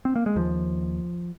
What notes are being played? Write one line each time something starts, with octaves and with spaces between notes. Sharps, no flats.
C4
A#3
G#3
D#2 F3